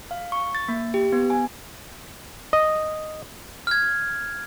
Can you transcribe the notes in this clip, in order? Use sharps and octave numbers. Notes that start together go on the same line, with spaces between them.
F5
C#6
A6
A#3
G4
B3
G#5
D#5
F6 G#6